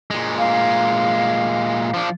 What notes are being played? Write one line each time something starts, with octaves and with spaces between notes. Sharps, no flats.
A#2 G#3
F5
F3 D4